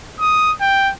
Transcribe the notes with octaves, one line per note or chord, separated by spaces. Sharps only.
D#6
G5